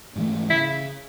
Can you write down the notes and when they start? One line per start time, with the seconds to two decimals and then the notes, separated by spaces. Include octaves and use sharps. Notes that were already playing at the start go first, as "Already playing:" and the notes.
0.16 G#2 E3 A3
0.50 C#3 E4